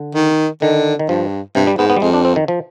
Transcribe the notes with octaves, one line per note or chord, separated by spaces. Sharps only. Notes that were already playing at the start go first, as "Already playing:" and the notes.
Already playing: D3
D#3
D3 D#3
D#3
G2 F3
G2 C3
G3
G#2 B3
B3
G3
F2 G#3
D4
C4
D#3
F3